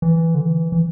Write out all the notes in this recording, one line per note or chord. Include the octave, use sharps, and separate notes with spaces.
E3
D3
E3
E3